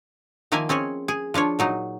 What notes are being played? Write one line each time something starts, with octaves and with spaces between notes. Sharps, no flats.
D#3 F3 A#3 A#4 E5 G#5
C4 C#4 G#4 C#5
G#4
F3 D4 F4 C#5
A#2 F#3 D#4